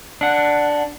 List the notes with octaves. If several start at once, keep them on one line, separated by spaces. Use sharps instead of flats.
D4 F#5